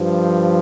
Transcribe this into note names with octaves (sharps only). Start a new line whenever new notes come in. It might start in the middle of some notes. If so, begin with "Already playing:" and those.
Already playing: G2 F3